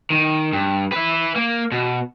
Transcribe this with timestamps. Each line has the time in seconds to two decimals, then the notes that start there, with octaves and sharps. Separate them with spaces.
0.10 D#3
0.53 G2
0.92 B4 E5
1.36 A#3
1.72 B2